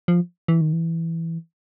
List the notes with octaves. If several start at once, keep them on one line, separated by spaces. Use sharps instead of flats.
F3
E3
D#3
E3